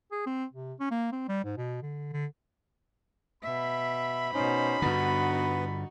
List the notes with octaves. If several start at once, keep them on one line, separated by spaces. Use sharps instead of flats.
G#4
C4
C3
C#4
A#3
C4
G3
G#2
B2
D3
D3
B2 E5 B5
B2 C#4 D#4 C5
G2 D3 B3 D#4 F#4 B4